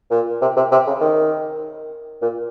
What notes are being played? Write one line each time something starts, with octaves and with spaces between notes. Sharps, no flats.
A#2
C3
C3
C3
C#3
D#3
A#2